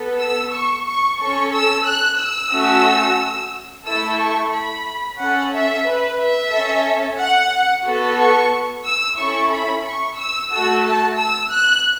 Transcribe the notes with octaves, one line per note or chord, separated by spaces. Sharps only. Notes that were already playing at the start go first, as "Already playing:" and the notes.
Already playing: B3 A4
E6
C#6
C#6
C#4 A4 C#6
E6
F#6
E6
A3 C#4 F#4
A3 E4 A4 E6
C#6
B5
C#4 A4 F#5
E5
B4
E5
C#4 A4
F#5
B3 F#4 A4
C#6
E6
C#4 E4 A4 C#6
B5
C#6
E6
A3 F#4 A4 E6
A5
E6
F#6